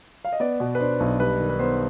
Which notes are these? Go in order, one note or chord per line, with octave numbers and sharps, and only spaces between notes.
F5
D#5
B3 D5
B2
B4
D4 C5
B1
G3 B4
D#3
B4
B3 C5